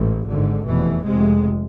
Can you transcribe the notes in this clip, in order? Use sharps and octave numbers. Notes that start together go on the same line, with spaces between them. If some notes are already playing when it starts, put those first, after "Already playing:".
Already playing: A1 G#2
G#1 G#2 D3
F1 E2 B2 E3
F1 F2 C3 G#3